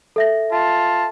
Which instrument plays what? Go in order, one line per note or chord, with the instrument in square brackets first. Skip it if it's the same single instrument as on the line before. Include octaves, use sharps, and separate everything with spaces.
[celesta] A4 E5 A#6
[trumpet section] F4 A5